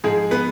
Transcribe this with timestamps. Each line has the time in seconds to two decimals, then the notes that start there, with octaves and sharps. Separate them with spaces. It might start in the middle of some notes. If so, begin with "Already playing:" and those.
0.04 G#2 F3 G#3 G#4
0.31 B3 B4